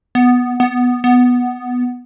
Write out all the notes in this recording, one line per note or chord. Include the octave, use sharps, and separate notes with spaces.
B3
B3
B3